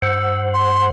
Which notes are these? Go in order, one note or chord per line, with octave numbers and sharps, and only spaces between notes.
G2 C5 F#5 E6
C6